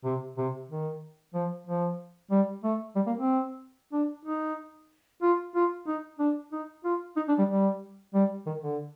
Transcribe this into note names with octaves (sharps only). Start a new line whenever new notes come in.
C3
C3
D#3
F3
F3
G3
A3
G3
A#3
C4
D4
D#4
F4
F4
D#4
D4
D#4
F4
D#4
D4
G3
G3
G3
D#3
D3